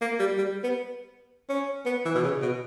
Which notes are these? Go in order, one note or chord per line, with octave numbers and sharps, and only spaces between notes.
A#3
G3
G3
B3
C#4
B3
E3
B2
C#3
B2